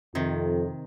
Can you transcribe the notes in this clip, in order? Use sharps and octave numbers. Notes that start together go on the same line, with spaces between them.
F2 C3 D#3